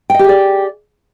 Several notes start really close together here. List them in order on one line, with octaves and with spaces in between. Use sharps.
G5 D#5 G4 G#4 D5